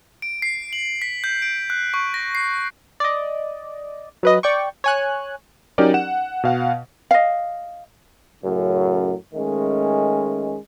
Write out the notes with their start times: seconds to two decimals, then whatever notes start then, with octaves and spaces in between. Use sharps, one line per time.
0.22 D7
0.42 C7
0.73 F#7
1.02 B6
1.24 G6
1.42 D7
1.70 F#6
1.94 C#6
2.14 A#6
2.35 C7
3.00 D5 D#5
4.23 F#3 B4 D#5
4.43 D5 G5 C#6
4.84 C#5 G#5 F#6
5.78 F#3 C#4 D#4 G4 A#4 D5
5.94 F#5 E7
6.44 B2 F5 F#5
7.11 D#5 F5
8.43 F#2 A2 C#3 F#3
9.34 D#3 G#3 A3 C#4